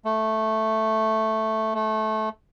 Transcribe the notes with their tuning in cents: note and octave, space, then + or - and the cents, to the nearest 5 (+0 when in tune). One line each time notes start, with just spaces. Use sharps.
A3 +0
A3 -15